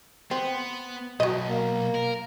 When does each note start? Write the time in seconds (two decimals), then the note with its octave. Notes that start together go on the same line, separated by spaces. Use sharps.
0.31 B3 C4
1.20 B1 F#3 D#5
1.49 A#3
1.95 A#4